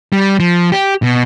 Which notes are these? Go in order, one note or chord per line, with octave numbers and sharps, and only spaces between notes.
G3
F3
G4
B2